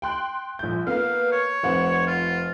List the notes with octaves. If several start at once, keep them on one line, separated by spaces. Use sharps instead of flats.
G5 C6 F#6
A#1 G6
A#3 B3 F5
C#5
F1 C4 F#5
F4